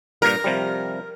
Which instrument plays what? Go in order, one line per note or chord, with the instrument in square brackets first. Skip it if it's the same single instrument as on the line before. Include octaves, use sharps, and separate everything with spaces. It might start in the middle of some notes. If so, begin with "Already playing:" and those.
[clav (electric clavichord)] G2 A#2 [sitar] A#4
[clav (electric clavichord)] C3 F3 G3